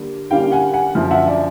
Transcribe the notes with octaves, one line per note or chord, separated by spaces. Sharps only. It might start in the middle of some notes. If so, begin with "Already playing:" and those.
Already playing: D3 G3 A#3
D3 G3 A#3 C#4 F5 G5
F#5 G#5
F#5 G#5
F#2 D3 F3
E5 F#5
D5 E5